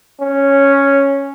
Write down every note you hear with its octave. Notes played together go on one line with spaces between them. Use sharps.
C#4